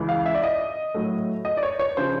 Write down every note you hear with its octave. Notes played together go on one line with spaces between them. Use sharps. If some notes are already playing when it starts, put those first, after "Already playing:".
Already playing: C#2 C#3 E3
F5
E5
D5
D#5
A2 F#3 A3
D#5
D5
C#5
C#5
C#3 F3 C5